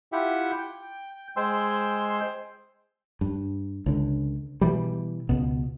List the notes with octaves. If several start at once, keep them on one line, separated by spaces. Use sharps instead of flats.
E4 F4 G4 E5 F#5 G5
G5
G#3 C5 G5 G#5 C6 E6
G2
C#2 D3
B2 E3 G3
C#2 B2